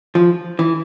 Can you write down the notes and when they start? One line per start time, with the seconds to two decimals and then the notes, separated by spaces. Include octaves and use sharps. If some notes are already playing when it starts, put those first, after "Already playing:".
0.15 F3
0.59 E3